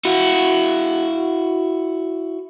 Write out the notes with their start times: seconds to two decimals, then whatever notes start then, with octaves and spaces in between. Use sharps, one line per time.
0.05 E4 F#4